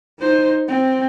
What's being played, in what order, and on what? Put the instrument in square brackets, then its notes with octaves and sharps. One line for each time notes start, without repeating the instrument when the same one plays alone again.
[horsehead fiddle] D#4 C5
C4